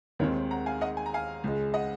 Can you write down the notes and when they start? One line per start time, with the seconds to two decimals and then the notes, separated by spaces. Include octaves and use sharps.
0.19 D#2 D#3 G#3 C4 D#4 A#4 C#5
0.51 F#5 A#5
0.66 F5 G#5
0.81 D#5 F#5
0.97 G#5
1.06 A#5
1.14 F5 G#5
1.44 C#2 C#3 G#3
1.74 D#5 F#5